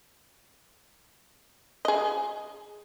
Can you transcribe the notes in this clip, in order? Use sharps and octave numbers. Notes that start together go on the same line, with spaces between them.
G#4 D#5